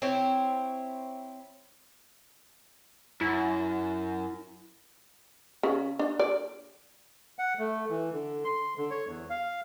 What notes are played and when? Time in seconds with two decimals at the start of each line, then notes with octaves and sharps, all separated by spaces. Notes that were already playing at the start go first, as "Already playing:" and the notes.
0.02 C4 E4 C#5
3.21 F#2 E4
5.63 C#3
5.99 D4
6.19 D5
7.39 F#5
7.59 A3
7.90 E3
8.12 D3
8.45 C6
8.77 D3
8.90 C#5
9.07 E2
9.30 F5